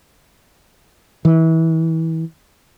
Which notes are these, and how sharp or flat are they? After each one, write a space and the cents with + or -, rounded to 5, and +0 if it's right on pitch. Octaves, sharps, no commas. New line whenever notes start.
E3 -25